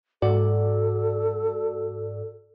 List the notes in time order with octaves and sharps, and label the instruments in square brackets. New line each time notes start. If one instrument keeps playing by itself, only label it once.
[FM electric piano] G#2 F#4 D5 [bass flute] A4